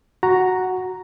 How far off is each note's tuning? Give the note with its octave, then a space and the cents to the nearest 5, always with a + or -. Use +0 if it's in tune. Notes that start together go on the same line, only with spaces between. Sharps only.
F#4 +0 A#5 +0